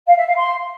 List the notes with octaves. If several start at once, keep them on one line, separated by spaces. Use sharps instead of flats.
F5
E5
F5
C6